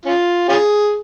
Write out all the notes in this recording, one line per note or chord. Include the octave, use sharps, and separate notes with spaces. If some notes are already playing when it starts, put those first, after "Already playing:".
C#4 F4
C#4 F4 G#4